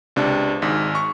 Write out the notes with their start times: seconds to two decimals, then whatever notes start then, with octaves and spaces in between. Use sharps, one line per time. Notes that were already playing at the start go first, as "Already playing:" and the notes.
0.16 C#2 C3 D4
0.62 G#1 G#2
0.95 C#6